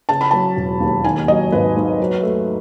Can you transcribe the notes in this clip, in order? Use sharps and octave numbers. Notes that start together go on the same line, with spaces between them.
C#3 A5
B5
F#3 A5
E1
D#2
D#3 G#5
F#3 D#5
G#1 B4
G#2
F#3
A3